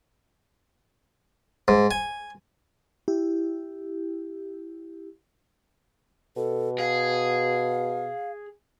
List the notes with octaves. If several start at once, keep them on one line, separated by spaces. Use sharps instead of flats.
G#2
G#5
E4 G4
B2 A4
G#4 F5